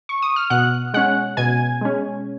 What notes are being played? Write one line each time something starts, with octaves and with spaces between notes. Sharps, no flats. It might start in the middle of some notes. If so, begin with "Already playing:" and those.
C#6
D#6
F6
B2 F#5 F#6
G#3 C#4 F#5 F#6
B2 G#5 G#6
G#3 C#4